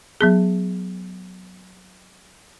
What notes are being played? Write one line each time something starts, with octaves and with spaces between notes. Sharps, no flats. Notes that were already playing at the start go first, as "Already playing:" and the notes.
F#3 B3 G#4